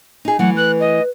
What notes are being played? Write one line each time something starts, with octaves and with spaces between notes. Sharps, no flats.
D#4 G#4
E3 F#3 A3 F#5
B4 F#6
D#5